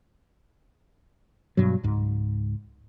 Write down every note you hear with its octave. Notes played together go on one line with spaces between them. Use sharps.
G2 B2 F#3
C#2 G#2